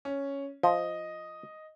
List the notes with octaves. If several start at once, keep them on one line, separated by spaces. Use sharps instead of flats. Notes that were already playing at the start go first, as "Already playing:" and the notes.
C#4
F3 D#5